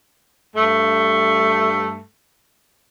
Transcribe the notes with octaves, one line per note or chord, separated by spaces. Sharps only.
G2 A3